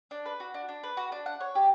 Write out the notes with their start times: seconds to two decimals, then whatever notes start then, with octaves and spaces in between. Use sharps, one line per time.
0.11 D4
0.25 B4
0.40 F#4
0.54 D4
0.69 D4
0.83 B4
0.97 F#4
1.12 D4
1.26 F#5
1.40 C#5
1.55 G4